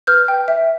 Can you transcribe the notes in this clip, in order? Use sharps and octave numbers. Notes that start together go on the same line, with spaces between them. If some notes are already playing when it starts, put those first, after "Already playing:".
B4 F6 G6
G5
E5